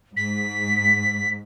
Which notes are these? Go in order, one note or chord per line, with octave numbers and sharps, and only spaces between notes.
G#2 B6